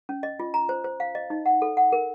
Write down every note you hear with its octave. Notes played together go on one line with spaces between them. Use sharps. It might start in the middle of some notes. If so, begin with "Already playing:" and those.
C#4
D#5
F4
A#5
C5
C5
F5
D#5
D#4
F#5
A4
F#5
A#4